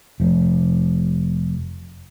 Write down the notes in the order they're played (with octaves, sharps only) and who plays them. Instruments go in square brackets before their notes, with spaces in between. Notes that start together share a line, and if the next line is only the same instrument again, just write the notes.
[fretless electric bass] F1 F3